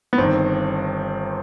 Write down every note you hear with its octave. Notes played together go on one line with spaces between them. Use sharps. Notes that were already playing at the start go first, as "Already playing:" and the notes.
B3
G1 G2 D#3 C4